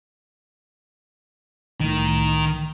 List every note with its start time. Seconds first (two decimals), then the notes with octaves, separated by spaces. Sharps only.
1.80 C2 A2 D#3